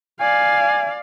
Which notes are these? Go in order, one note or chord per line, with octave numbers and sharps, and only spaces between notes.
D5 F5 G#5